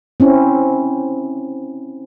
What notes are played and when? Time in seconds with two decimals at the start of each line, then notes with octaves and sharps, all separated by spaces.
0.20 C4 C#4 E4